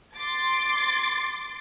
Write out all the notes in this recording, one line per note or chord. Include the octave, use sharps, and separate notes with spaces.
C6 D6 A6